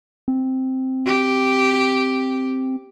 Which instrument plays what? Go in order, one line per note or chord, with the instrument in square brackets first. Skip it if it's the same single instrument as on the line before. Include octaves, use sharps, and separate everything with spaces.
[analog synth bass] C4
[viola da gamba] G4